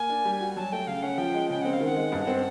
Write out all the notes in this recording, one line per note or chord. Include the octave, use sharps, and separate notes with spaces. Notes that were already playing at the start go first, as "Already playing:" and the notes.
Already playing: A#3 G#5
D4
G3
F#4
F#3 A5
A3 G5
C#3 F5
C#4 F#5
F3 G5
G#3
C#3 G5
C4 F#5
F5
D#3 F#5
G#3
G2
C4